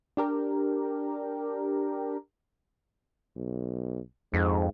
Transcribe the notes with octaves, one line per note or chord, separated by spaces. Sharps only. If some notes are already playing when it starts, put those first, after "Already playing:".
D4 G4 A#4
B1
F2 G#2